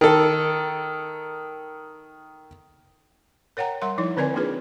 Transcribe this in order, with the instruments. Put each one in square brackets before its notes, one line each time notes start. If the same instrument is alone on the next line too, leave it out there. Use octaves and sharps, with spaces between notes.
[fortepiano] D#3 A4
[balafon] A#4 C#5 F#5 G5 A#5
G3 A#4 F#5 C6
F3 D#4 E4 C#5
D3 C4 A#4 B4 D5 G#5
A#3 D4 D#4 F4 G#4 B4